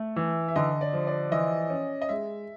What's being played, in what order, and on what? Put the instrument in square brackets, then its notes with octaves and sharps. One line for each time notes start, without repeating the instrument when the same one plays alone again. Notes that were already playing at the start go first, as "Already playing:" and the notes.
Already playing: [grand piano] A3
E3
[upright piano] E5
[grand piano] D3 [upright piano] D#5
[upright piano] D5
[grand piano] F3
[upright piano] D5
[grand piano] E3 [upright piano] D#5
[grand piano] C#4
[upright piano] D#5
[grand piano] G#3 [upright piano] E5